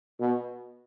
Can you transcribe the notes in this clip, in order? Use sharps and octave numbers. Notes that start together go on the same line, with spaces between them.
B2